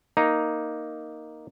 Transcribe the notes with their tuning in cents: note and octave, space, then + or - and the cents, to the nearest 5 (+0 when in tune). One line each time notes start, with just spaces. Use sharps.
A#3 +0 D#4 +0